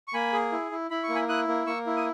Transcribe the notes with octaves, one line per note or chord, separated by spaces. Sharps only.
C#6
A#3 G#5 B5
G#4
E4
E4
E4 B5
C#6
A#3
G#5 B5
E4 D#6 F#6
A#3
A#3 C#6 E6
E4
D#6